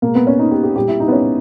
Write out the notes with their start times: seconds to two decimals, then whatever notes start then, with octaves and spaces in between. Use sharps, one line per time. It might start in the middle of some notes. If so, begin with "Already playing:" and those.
0.02 B2 G#3 A#3
0.15 B3
0.27 C#4
0.39 D#4
0.51 G4
0.63 G4
0.76 A#2 G3 A#3 G4
0.88 E4
1.00 D#4
1.08 B3
1.12 C#4